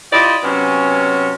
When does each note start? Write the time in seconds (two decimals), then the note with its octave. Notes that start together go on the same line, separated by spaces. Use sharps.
0.12 E4 F4 G4 D5 D#5
0.43 C3 F#3 B3 C#4